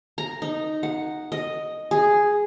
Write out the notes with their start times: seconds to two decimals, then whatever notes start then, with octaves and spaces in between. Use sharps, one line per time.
0.18 A#5
0.42 D#4
0.83 F#5
1.32 D#5
1.91 G#4